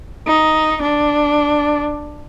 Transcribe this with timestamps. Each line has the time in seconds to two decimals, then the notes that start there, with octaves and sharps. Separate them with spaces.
0.27 D#4
0.82 D4